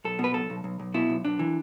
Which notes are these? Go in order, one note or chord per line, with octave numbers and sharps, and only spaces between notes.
B1 A4
B2
B4
B1 A4
B1
B1
B1
B2 E4
B1
B1 D4
E3